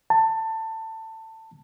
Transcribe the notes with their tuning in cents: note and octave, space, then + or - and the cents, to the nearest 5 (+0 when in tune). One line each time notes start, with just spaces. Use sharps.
A5 +20